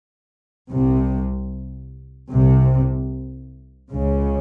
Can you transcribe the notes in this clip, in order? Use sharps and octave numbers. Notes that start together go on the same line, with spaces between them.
C2 C3
C2 C3
C#2 C#3